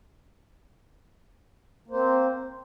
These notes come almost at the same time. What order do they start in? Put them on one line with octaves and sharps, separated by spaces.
A#3 C5 C4